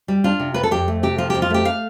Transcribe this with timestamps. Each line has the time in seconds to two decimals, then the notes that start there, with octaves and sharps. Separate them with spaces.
0.08 G3
0.24 D4 F4
0.39 C3
0.54 F4 B4
0.63 A4
0.71 F2 G4
0.88 A3
1.03 C3 G4
1.18 F3 F4
1.30 F2 G4
1.42 F4
1.50 A3 G4
1.65 F5